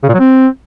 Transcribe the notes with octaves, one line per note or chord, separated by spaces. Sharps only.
C#3
A#2
F#3
C4